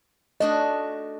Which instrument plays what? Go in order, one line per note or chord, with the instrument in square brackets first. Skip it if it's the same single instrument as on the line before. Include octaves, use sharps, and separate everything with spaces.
[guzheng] A3 D4 F#4 [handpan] D#5